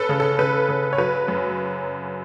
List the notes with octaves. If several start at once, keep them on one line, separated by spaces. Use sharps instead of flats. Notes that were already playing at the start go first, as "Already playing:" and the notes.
Already playing: C#4 A4 B4
C#3
A4
C#3 B4
C#3
C#5
F#3 B4
F#2